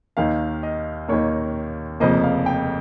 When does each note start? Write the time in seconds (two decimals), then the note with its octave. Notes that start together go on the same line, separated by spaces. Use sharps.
0.17 D#2 D#3 A#3 F5
0.63 D#5
1.08 D#2 D#3 A#3 C#5
2.00 F1 F2 C#3 F3 A#3 D#5
2.24 F5
2.46 G5